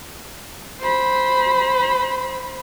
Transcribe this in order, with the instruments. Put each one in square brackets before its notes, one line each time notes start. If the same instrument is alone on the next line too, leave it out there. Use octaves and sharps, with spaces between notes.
[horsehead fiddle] C5 B5